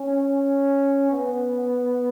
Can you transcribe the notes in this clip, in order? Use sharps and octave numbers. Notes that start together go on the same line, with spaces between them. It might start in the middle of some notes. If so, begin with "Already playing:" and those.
Already playing: C#4
B3